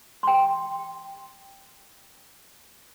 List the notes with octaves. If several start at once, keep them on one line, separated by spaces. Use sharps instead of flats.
G5 C6